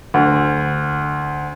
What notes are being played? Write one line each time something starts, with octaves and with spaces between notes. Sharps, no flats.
D2